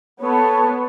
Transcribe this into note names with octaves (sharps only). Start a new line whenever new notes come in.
B3 A4 C#5 A5